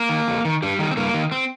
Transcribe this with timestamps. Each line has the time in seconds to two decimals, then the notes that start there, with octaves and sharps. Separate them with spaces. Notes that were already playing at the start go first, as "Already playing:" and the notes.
Already playing: A#3
0.09 D#3
0.28 F2
0.45 D#3
0.62 G2 G3
0.79 D#3
0.91 C4
0.97 G2 A#3
1.14 D#3
1.32 C4